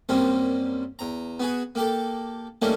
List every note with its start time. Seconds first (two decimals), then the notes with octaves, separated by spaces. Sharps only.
0.09 F#2 G3 A#3 C4 C#4
0.99 E2 A#5
1.40 B3 F#4 G#4
1.75 A#3 G4 A4
2.62 F#3 G3 A3 A#3 C#4 D#4